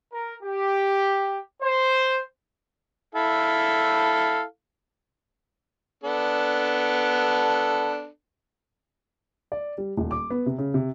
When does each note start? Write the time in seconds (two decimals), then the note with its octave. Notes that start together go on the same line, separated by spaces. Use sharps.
0.12 A#4
0.42 G4
1.62 C5
3.15 E4 A4 F5
6.04 B3 D4 A4
9.52 D5
9.78 G3
9.97 D#1
10.11 D6
10.30 B3
10.46 C3
10.58 C#3
10.74 C3